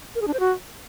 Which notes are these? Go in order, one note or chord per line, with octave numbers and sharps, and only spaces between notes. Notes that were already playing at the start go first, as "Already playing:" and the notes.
A#4
G#4
D4
C5
F#4